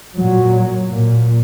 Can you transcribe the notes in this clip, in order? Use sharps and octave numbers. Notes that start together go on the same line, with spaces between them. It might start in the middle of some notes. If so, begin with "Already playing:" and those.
A#2 F#3
A#2